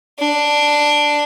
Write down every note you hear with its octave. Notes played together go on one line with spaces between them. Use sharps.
D4